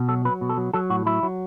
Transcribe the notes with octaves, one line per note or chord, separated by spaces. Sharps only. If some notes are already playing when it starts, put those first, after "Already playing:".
Already playing: B2
F#3 A4
F#3 B4
B2
A4
F#3
F#3 A4
A2 F#4
F#3 E4
F#3